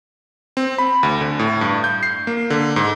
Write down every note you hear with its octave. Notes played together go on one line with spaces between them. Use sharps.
C4
B5
D2
D3
A2
G2
G6
C7
A#3
D3
G#2